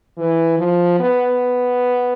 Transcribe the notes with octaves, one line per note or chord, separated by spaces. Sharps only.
E3
F3
B3